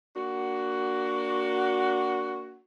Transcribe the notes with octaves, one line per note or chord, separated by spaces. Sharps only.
A#3 D4 F#4